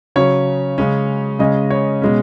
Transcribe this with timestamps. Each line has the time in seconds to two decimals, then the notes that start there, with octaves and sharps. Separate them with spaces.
0.16 C#3 F#3 C#4 C#5
0.78 C#3 G#3 C#4
1.39 C#3 G#3 C#4 D#5
1.70 C#5
2.02 B2 G#3 C#4